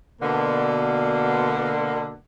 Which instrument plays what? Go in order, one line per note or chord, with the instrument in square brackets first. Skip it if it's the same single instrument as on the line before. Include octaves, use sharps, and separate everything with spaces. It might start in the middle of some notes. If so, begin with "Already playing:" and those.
[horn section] B2 D3 A#3